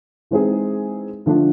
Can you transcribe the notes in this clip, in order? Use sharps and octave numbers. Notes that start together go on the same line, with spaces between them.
E3 G#3 C4 D#4 G#4
D3 F3 A3 D4